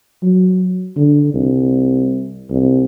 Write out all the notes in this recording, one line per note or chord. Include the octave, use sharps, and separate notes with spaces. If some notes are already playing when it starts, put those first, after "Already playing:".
F#3
D3
C2
C2